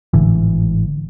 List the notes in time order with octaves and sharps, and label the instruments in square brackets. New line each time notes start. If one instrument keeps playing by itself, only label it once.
[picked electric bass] G#1 A2 D3 E3